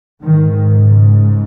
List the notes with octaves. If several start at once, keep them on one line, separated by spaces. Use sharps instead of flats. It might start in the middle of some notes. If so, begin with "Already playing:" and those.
G#2 D#3
C#3